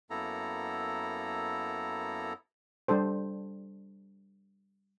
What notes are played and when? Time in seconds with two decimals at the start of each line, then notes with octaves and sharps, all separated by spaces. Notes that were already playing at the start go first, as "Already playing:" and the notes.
0.10 F#2 A#3 B3 E4 A4 A#5
2.88 G3 D4 A4 C5